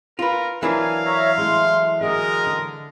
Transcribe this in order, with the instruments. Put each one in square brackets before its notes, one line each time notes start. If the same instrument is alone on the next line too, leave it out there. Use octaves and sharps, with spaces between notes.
[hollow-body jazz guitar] F4 B4 [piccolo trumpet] A#4
[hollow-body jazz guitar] E3 F#3 D4 [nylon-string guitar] A#4 [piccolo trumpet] F5 [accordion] G#5
[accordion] C#5 E5 A#5
[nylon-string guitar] G#3 A3 E4 [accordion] C6
[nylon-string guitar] D3 F#4 G#4 [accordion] G#3 D#5 [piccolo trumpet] A#4
[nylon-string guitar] D3